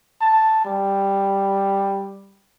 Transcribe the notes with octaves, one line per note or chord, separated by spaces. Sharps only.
A5
G3